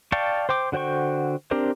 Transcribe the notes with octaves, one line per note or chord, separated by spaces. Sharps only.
D5 F5 G5 A5 C#6
C5 G5 D6
D3 F#4 C5 G5 C#6
C4 D4 G4 A#4 C5